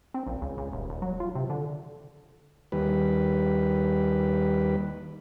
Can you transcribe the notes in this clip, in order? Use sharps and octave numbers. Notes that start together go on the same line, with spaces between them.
C4
A#1
C#2
C#2
D#1
D#1
F#3
F4
C3
D3
D#2 G3 B4